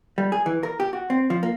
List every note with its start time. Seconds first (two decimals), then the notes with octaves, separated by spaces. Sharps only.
0.18 G3
0.32 G#4
0.46 E3
0.63 A#4
0.80 G4
0.93 F#4
1.10 C4
1.30 F3
1.43 A#3